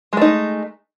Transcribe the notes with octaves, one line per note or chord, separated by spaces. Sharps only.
G#3 A3 D#4